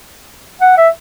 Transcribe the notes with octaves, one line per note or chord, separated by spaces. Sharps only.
F#5
E5